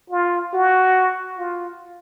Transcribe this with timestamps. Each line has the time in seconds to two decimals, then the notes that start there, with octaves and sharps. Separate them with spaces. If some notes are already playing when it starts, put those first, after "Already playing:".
0.10 F4
0.54 F#4
1.38 F4